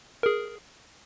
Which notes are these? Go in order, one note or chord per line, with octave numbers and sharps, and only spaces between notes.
G#4 A#4